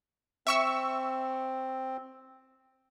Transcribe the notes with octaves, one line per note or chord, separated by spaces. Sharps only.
C4 E5 C#6 E6